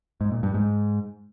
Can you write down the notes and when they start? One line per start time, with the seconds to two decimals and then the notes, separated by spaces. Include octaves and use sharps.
0.21 G#2
0.32 A#2
0.43 G2
0.54 G#2